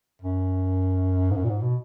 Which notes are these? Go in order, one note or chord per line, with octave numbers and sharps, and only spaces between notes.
F#2
G#2
F#2
A#2
G#2
B2